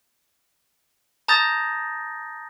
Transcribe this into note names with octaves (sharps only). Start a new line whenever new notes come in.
A5 A#5 D#6 G6 A6 A#6